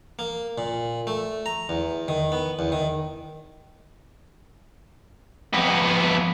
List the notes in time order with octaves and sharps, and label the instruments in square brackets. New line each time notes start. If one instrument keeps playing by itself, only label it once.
[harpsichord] A#3
A#2
A3
A#5
E2
D#3
B3
E2
D#3
[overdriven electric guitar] F2 B3